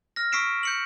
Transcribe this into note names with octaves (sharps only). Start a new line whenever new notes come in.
F6 A#6
C#6 E6 B6 C7 D7 E7
G6 C#7 F#7